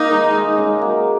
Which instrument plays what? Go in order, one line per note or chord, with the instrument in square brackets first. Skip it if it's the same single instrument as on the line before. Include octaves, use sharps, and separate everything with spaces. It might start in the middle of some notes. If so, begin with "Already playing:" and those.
Already playing: [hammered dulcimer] D#3 A#3 [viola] D#4
[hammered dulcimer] G#3
G#3
G#3 C#4
F#3 A#3